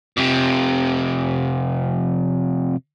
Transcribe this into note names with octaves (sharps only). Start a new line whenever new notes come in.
F2 C3